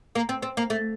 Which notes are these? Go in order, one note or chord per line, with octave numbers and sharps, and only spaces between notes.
A#3
C4
C4
A#3
A3